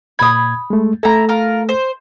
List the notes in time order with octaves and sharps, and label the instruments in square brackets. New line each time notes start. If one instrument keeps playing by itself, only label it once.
[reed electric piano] A#2 G#6 [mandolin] B5 D#6
[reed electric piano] G#3 A3
[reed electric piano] A3 A4 [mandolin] E4 A#5
[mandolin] F4 A#4
C5